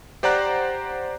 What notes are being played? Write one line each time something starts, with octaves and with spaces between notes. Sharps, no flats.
G4 C5 D5 F#5 A#5 F#6